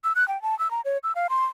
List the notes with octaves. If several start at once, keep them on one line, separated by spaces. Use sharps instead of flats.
E6
F#6
G5
A5
E6
A#5
C#5
E6
F5
C6